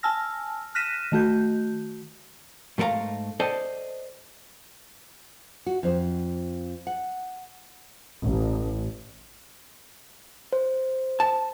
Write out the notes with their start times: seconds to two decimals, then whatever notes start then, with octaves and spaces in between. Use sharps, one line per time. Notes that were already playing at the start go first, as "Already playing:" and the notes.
0.03 G#5 A5 E6 F6 A#6
0.75 F6 F#6 A#6 B6 D#7 E7
1.12 D#3 A3 F#4 G6
2.78 G#2 A3 A#4 F5 A#5
3.40 A4 C5 D5 D#5 G5 A5
5.66 F#4
5.83 F2 C5
6.87 F#5
8.23 A1
10.53 C5
11.20 A5